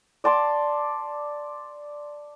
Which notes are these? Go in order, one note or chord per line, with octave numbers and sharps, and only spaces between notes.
D5 A5 C6 D6